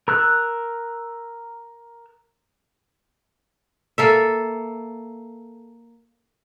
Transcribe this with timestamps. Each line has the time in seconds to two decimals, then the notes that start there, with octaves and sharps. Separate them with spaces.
0.08 A#4 E6 F#6
3.98 A#3 A4 E5